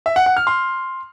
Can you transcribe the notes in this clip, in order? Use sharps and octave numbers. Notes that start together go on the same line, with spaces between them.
E5
F#5
F#5
F6
C6